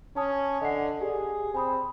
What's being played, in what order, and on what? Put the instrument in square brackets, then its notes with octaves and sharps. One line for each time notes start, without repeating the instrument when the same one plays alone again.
[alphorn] C#4 [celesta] A5 D#6
[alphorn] D3 [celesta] D#5 F#5 C7
[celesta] G4 D5 [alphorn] G#4
[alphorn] C4 [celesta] G#5 B5 D#6